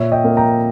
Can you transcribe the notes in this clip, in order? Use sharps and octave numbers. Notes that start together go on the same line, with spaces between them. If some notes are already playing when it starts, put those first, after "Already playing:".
Already playing: A#2 C#5 E5
D#5 G5
A#3
G5 A#5